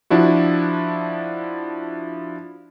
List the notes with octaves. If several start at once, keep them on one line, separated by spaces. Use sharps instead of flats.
F3 D4 E4 F#4